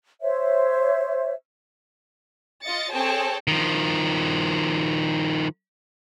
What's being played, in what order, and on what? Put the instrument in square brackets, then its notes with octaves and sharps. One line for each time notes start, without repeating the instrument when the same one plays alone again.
[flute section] C5 C#5 E5
[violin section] F4 D#5 A6 C#7
C4 G#4 A4 C#5 G5 A5
[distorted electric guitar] D#3 F3